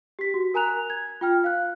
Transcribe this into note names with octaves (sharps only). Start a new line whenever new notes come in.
G4 B6
F#4
A#4 G#5 A#5 F#6 F7
G#6
F4 G5 F6
F5 F#6